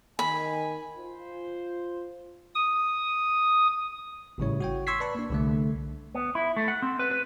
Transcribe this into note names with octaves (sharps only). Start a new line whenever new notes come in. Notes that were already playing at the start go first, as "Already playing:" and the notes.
D#3 G#5 B5
F4 C5
D#6
G#1 A2 C#3 G3 E4 C#5
F#4 C#5 G5
C6 C#6 E6 G#6 B6 C7
B4 D5 A5 B5 C#6
A#3 D4
C2 D3 A3
B3
E4
A3
F#5
C4
B4
B4